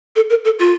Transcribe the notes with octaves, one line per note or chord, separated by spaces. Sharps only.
A4
A#4
A4
F4